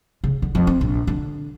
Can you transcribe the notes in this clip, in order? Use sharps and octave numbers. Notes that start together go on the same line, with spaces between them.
C#3
D3
F2
C4
A#1
D3